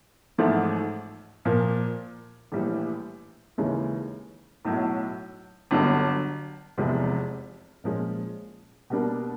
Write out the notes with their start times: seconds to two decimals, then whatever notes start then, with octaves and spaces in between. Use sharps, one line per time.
0.38 A1 G#2 F3 A3
1.45 A#2 F3 A#3
2.52 A#1 A2 E3 G3
3.58 D#2 C#3 E3 G#3 C#4
4.65 B1 A2 F#3
5.71 G1 G2 D3 F#3
6.78 F1 E2 C3 F3 G#3
7.84 A#2 F3 G#3 C#4
8.90 B2 G3 A#3 D4